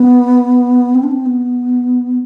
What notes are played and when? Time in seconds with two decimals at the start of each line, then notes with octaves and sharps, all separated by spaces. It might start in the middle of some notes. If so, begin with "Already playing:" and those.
Already playing: B3
0.95 C4
1.03 D4
1.11 C4
1.26 B3